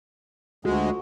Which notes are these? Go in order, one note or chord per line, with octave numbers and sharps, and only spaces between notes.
D2 G#3 F4 F#4 A4